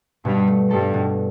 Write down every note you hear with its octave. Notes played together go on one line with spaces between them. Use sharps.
G2 B2
A3
G2 A4
B2